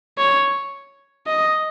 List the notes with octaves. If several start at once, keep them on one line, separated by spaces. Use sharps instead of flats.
C#5
D#5